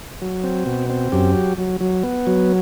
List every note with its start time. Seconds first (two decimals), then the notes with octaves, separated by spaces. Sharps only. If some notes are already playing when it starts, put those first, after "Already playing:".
0.22 F#3
0.44 C4
0.66 B2
0.90 C4
1.12 F#2 G4
1.35 F#3
1.58 F#3
1.81 F#3
2.03 B3
2.27 F#3